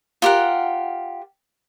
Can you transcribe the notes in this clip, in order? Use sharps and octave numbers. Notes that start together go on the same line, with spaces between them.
F4 G4 A#4 F#5